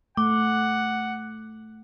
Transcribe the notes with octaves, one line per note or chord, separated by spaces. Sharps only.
A3 F#5 D6